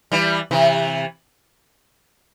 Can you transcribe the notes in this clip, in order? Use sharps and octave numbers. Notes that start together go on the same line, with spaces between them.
E3 G3
C3 E3